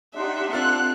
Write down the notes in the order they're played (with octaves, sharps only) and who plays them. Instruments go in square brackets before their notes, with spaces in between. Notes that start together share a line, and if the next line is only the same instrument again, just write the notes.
[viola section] D4 D#4 G4 [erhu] E5 [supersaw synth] F#5 C6
[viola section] C4 [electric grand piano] D4 F4 A4 [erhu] F#6